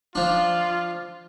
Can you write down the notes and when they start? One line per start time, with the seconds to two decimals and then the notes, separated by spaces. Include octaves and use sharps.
0.15 F3 D4 F4